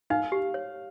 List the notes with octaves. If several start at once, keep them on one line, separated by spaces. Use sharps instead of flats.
D#4 F5
G4
C#5